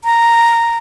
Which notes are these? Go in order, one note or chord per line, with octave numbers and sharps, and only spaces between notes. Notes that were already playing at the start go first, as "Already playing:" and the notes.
A#5